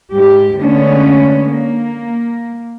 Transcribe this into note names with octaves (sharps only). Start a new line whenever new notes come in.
G#2 G4
D3 G#3 A3 B3 C#4 D4
A#3